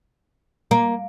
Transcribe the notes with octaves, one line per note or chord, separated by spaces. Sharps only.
A#3